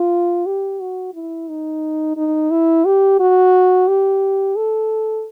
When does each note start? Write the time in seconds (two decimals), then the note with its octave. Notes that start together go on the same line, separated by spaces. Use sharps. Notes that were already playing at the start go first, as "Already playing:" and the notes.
Already playing: F4
0.46 G4
0.80 F#4
1.14 E4
1.49 D#4
2.17 D#4
2.51 E4
2.85 G4
3.20 F#4
3.88 G4
4.56 A4